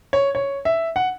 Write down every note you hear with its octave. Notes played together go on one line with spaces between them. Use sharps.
C#5
C#5
E5
F#5